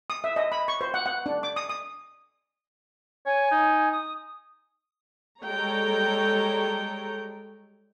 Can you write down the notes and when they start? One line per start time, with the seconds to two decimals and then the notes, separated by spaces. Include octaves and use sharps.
0.10 D#6
0.24 E5
0.36 D#5
0.52 B5
0.68 C#6
0.81 C5
0.94 F#5
1.06 F#5
1.26 D4
1.43 D6
1.56 D#6
1.70 D#6
3.26 C#5 G#5
3.51 D#4
3.92 D#6
5.44 G3 G#3 A4 C#5 G5 A#5